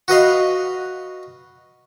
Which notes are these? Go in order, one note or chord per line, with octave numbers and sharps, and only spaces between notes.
F#4 B4 D#5 F5